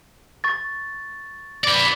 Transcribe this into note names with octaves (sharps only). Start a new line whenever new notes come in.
C#6 A6
B4 D5